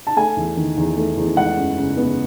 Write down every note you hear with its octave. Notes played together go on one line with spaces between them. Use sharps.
A5
A3 G#5
E2
D#3
E2
A3
E2
G#3 F#5
F#2
C#3
B3